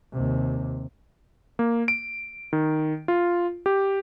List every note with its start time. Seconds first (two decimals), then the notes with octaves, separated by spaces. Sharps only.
0.12 D#2 C3
1.59 A#3
1.88 D7
2.53 D#3
3.08 F4
3.66 G4